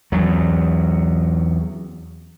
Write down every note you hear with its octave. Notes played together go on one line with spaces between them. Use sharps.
E2 F#3